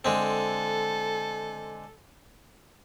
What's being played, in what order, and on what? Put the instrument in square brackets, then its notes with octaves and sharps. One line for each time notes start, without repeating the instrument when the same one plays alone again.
[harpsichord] D3 G#3 C4 [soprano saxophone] A4